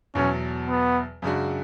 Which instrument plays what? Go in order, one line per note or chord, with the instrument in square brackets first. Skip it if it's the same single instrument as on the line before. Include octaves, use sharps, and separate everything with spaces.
[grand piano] E2 B2 F#3 [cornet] C#4
[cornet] B3
[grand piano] F#2 C#3 G#3 D4 F#4